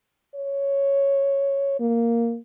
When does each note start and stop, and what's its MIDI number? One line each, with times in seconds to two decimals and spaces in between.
0.35 1.80 73
1.80 2.38 58